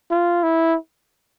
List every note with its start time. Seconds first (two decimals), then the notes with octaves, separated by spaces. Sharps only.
0.11 F4
0.43 E4